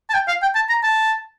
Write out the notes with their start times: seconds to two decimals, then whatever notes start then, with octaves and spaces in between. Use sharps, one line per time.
0.10 A5
0.14 G5
0.28 F5
0.42 G5
0.55 A5
0.69 A#5
0.83 A5